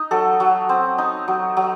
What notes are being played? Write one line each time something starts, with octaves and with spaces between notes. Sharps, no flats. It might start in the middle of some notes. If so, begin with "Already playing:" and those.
Already playing: D#4 D#5
F#3 A4
F#3
C4
D#4
F#3
F#3